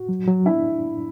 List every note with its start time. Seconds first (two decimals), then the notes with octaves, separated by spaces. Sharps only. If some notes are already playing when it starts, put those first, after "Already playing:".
Already playing: F#4
0.09 F#3
0.28 F#3
0.46 D4 E4